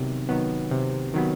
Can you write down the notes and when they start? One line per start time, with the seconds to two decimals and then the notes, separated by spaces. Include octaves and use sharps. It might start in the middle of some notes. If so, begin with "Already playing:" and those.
Already playing: C3 D#3 F#3 B3
0.29 D#3 F#3 B3
0.71 C3
1.14 D#3 F#3 B3